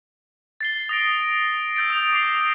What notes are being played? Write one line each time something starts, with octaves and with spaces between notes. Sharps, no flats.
A6 C7 G7
D#6 A#6 D7
E6 G6 A6 D7
D#6 F7
D6 A#6 C7 G7